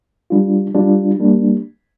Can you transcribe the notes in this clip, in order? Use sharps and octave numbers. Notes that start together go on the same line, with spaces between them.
G3 D4 F4
G3 D4 F4
G3 A#3 D4